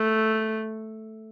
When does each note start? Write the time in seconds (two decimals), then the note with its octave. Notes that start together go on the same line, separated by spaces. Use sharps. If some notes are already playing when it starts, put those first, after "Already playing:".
Already playing: A3